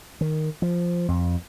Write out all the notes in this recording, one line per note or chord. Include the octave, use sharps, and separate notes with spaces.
D#3
F3
F2